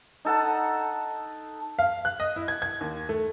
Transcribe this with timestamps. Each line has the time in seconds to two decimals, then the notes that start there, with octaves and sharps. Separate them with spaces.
0.25 D#4 A4 F#5 A5
1.79 F5
2.05 F#6
2.20 D#5
2.36 E4
2.48 G#6
2.62 G#6
2.81 D#2
3.09 A3